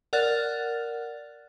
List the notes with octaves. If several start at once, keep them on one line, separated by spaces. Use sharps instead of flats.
A#4 D5 F#5 F6 F#6 A6